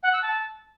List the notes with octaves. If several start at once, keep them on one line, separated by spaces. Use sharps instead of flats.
F#5
E6
A5